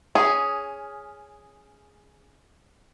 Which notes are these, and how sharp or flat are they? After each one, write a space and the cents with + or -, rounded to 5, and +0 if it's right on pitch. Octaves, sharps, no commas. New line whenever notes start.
C#4 +10 G#4 +0